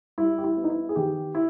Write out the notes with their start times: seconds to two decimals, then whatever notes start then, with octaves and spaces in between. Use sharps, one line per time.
0.18 G3 E4
0.38 G4
0.44 E4
0.57 B3
0.64 D#4
0.70 E4
0.89 G#4
0.96 D#3 G4
1.35 E4